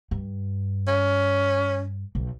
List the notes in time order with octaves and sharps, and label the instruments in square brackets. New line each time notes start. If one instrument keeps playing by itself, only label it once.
[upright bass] G2
[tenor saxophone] C#4
[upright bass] B1